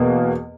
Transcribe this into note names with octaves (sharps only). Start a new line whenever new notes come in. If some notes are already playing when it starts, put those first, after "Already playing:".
Already playing: E2 B2 A#3